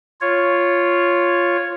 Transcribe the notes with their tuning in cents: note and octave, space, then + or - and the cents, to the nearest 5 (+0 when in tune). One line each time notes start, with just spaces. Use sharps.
F4 +0 C#5 +0